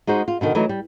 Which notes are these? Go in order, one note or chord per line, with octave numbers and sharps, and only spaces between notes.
G#3 D#4 F#4 C5
F4
B2 D3 D#3
E3 F#3 A3 D#4
G3